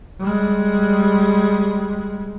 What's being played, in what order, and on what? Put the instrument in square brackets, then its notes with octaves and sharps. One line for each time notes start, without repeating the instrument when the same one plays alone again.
[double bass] G3 G#3